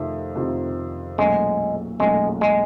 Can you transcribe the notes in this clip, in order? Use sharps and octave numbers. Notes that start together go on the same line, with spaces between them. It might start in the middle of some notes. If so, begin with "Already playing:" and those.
Already playing: F2 C3 D#3 A3
F2 C3 D#3
B1 A#2 F#3 G#3 A3 C#4
B1 A#2 F#3 G#3 A3 C#4
G#3